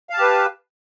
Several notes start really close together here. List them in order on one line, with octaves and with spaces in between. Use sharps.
F5 A5 G4 B4